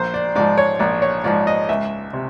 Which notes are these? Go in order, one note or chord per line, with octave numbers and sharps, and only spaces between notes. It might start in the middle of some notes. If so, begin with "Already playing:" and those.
Already playing: A#1 C5
D5
G#2 F3 D5
C#5
A#1 D5
C#5
G#2 F3 D5
D#5
C#2 E5
C3